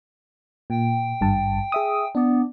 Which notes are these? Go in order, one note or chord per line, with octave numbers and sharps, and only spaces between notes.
A#2 G5
G#1 G2 A5
G#4 E5 D#6
B3 D4 D5